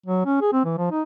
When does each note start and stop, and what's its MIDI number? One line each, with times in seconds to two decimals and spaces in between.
0.06 0.24 54
0.26 0.37 61
0.41 0.50 68
0.53 0.61 60
0.65 0.75 52
0.78 0.88 53
0.91 1.02 63